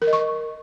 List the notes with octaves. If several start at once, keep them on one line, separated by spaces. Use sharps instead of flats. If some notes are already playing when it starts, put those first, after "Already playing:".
A#4
D#5
C#6